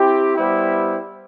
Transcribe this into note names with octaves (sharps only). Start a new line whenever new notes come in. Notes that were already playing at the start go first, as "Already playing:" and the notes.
Already playing: C4 E4 G4
G3 B3 E4 G4 C5